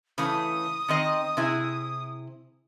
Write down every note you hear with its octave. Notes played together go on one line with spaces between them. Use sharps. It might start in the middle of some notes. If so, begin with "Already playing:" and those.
C#3 E3 A3 D#6
D#3 C4 D#5
C3 E4 G#4